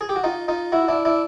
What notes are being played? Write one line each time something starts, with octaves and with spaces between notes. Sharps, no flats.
G#4
G4
F#4
D#4 F4
D#4 F4
E4 F#4
D4 E4
D4 E4